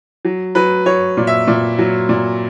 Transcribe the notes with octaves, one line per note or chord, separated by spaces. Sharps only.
F#3
F#3 B4
F#3 C#5
A#2
E5
A#2
F#3
A#2